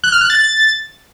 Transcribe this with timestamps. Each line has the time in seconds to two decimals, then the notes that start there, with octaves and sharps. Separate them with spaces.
0.04 F#6
0.12 F6
0.21 F#6
0.30 A6